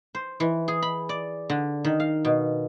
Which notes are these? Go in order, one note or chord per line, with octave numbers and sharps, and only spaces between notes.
C5
E3
G#4
B5
D5
D3
D#3
F5
B2